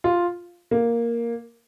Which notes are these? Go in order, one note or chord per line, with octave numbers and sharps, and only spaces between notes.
F4
A#3